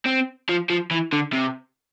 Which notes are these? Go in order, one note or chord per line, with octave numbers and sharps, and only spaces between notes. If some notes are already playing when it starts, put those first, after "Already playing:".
C4
F3
F3
E3
D3
C3